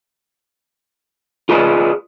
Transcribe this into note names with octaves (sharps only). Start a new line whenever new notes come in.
F4 G#4 B4 D5 D#5